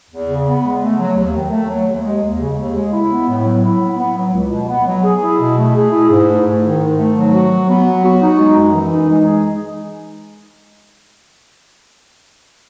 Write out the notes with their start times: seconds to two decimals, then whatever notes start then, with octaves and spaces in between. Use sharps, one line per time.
0.10 E2
0.28 C#3
0.46 B3
0.64 G#3
0.81 A3
0.99 F#3
1.16 D#2
1.33 D#3
1.51 A3
1.68 F#3
1.87 D#2
2.04 G#3
2.22 D#2
2.39 C#3
2.57 D#2
2.75 G#3
2.93 E4
3.10 B3
3.27 A2
3.44 F#3
3.62 E4
3.80 B3
3.98 B3
4.16 F#3
4.32 C#2
4.50 B2
4.68 B3
4.86 F#3
5.03 G#4
5.21 E4
5.39 B2
5.56 A3
5.74 G#4
5.91 E4
6.09 G#2
6.27 A3
6.45 G#2
6.62 D#3
6.79 G#2
6.97 A3
7.14 F#3
7.33 F#4
7.50 F#3
7.67 B3
7.84 F#3
8.03 F#4
8.21 D#4
8.38 G#3
8.55 F#2
8.72 E3
8.91 D#4
9.08 G#3
9.26 G#4